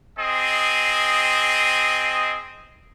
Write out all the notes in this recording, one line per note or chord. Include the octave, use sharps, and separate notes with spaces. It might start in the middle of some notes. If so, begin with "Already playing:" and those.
C4 G#4 D#5